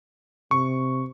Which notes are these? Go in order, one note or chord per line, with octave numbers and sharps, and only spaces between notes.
C3 C#6